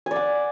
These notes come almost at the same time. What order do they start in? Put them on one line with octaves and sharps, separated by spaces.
G#5 D5 F#5